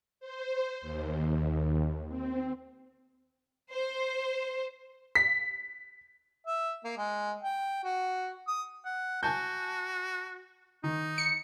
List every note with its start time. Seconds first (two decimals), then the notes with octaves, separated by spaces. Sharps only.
0.20 C5
0.82 D#2
2.08 C4
3.72 C5
5.15 B6
6.46 E5
6.84 A#3
6.97 G#3
7.42 G5
7.84 F#4
8.47 D#6
8.85 F#5
9.23 F#4 G#5 A5 G6
10.84 D#3 D#4
11.18 C#7